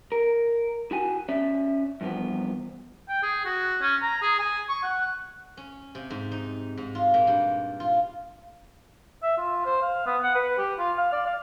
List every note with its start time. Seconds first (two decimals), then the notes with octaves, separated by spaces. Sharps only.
0.12 A#4
0.91 E4 F#4 G#5
1.29 C#4 D5 E5
2.01 G2 E3 F3 B3
3.09 G5
3.23 G#4
3.45 F#4
3.81 C#4
4.02 A#5
4.22 G#4
4.39 G#5
4.69 C#6
4.83 F#5
5.57 C#4
5.95 C3
6.10 G#2
6.32 D#4
6.77 G#2
6.95 F4
7.14 A#2
7.27 G2
7.80 F4
9.22 E5
9.37 F4
9.65 C5
9.82 F5
10.06 B3
10.23 F#5
10.35 B4
10.58 G4
10.78 F4
10.98 F5
11.12 D5
11.26 F5